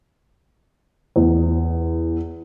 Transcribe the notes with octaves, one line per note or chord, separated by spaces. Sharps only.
E2